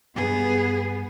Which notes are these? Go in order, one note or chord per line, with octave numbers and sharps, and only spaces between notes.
B1 G2 B3 G#4